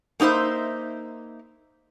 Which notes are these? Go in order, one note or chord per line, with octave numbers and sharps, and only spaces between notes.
A#3 D#4 E4 C5 E5